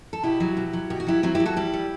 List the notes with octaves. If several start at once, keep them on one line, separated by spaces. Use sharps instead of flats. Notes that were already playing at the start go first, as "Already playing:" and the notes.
A4
B2 E4 G4
F#3
B2
F#3
B2 G4
F#4
F#3 E4 G4
F#3 C4 E4
E4 G4
F#3
F#4 A4
G3 E4 G4
G3